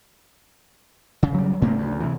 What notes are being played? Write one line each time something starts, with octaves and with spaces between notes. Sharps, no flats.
C#3
F#3 G3
A2 C#3 A3 A#3 C4
D2
C3 E3